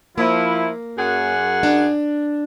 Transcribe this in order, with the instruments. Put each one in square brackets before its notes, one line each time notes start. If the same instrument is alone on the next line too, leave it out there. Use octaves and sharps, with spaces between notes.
[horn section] F3 E4 [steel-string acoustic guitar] A#3
[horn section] F#2 G#4 F#5
[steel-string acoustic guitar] D4